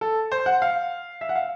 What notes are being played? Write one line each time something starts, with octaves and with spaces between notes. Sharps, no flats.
A4
C5
F#5
F5
E5
F#5
F5